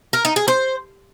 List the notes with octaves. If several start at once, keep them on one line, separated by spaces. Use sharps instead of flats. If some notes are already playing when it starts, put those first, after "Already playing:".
A#4
D#4
G#4
C5